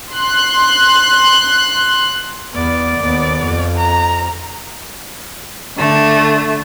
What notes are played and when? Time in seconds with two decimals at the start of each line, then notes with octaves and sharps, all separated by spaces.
0.13 C6 F#6
2.54 E2 B3 D5
3.00 D#2 B3
3.44 F2
3.76 A#5
5.77 D3 A3